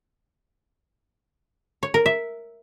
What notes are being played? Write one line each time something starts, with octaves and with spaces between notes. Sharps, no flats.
C#5
A#4
E5